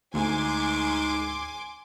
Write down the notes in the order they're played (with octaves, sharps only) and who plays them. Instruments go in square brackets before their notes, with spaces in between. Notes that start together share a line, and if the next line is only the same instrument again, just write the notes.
[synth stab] D2 [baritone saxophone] G#2 [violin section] G#5 C6 D6